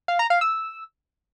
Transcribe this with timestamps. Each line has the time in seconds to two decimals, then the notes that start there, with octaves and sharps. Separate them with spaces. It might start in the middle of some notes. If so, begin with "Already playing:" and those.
0.08 F5
0.19 A#5
0.30 F5
0.41 E6